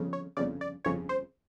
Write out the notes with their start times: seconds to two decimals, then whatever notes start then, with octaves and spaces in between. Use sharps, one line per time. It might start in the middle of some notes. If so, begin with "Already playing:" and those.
Already playing: G1 F2 C#3
0.13 C#5
0.37 G1 F2 C#3 D5
0.61 D5
0.84 G1 F2 C#3 C#5
1.09 C5